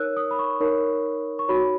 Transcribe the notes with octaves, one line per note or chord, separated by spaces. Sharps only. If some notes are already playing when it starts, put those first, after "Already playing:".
Already playing: D#4 A#4 C#5 E6 F#6
D#6
B5
C#6
D#4 A#4 C#5
C#6
D#4 F#4 C#5 B5